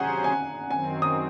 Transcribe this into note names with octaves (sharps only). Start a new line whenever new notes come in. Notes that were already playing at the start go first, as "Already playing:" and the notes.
Already playing: C3 F#3 C#4 G#4 C5 F#5 G#5 A#5
G#5
F#2 D#3 F#3 C4 G#5
D#6